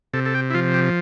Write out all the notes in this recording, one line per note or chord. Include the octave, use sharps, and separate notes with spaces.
C3 A4
A4
G4
E4
F3 F4
G4